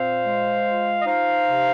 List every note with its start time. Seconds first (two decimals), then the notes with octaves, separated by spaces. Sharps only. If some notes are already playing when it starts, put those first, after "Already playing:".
Already playing: A#2 C4 C5 F5
0.25 G#3
0.66 F4
1.02 D#5
1.06 D#4 C5 F5
1.47 C3